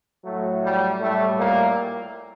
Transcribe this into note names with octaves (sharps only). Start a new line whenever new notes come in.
A2 F#3 A3
G3
A2 G3 A3
A#2 A#3